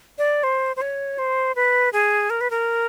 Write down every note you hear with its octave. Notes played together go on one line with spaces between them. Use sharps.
D5
C5
C5
C#5
C5
B4
G#4
A#4
B4
A#4